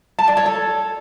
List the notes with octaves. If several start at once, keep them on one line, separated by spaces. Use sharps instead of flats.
A5
D5
C#5
A4